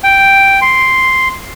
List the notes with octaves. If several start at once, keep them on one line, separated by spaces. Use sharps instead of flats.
G5
C6